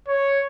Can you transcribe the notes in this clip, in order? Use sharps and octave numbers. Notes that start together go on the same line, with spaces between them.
C#5